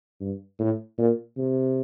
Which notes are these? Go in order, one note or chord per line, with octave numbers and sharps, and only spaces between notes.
G2
A2
A#2
C3